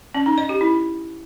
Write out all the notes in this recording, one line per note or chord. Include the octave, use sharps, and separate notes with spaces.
C#4
D#4
D#5
G4
E4